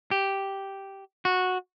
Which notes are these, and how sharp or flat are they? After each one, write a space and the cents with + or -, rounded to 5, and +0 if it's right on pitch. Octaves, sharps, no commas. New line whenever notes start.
G4 -5
F#4 -10